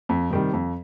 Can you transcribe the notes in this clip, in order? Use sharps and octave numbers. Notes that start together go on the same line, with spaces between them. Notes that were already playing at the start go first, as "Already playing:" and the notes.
F2
C3 D#3 G3
F2